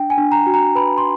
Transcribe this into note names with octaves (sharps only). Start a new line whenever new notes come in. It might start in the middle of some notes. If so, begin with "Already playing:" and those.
Already playing: D4 G5
G#5
D4
A#5
F#4
A#5
B4 B5
C6